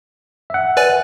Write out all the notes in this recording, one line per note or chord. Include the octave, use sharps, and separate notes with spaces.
E5 F#5
B4 D5 G#5